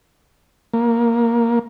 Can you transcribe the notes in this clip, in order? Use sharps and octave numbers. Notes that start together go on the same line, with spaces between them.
A#3